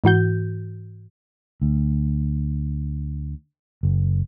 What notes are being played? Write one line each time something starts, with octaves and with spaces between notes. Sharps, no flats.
G#2 E3 F#4 G6
D2
F#1